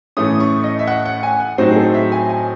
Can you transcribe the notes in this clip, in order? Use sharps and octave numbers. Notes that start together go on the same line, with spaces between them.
A2 E3 A3 C#4 D#6
C#6
D#5
E5
F#5
F#5
G#5
F#5
A2 F#3 C4 D#4 C5
G#4
A4
E5
G#5
G#5